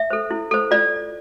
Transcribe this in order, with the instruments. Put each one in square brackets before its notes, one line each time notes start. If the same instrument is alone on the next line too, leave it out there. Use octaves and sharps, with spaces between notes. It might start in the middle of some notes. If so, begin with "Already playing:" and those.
Already playing: [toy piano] E5
A4 C5
E4
A4 C5
F4 D5